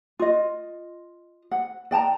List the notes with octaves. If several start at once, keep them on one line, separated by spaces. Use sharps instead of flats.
F4 D#5
F#5
D5 G5 A5 A#5